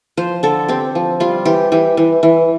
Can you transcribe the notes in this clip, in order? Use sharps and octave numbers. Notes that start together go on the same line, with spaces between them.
F3 C5
D3 A4
C4 G4
F3
G3 F4
E3 G4
E3 G4
E3
E3